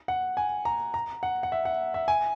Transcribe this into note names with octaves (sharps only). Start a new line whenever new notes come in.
F#5
G#5
A#5
A#5
F#5
F#5
E5
F#5
E5
G#5